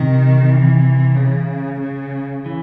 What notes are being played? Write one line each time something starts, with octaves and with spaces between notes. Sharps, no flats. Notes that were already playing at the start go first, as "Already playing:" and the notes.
Already playing: C3 D#3
E3
C#3
C#3
E3